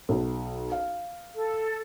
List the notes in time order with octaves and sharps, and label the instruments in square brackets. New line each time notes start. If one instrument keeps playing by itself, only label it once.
[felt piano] B1
F5
[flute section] A4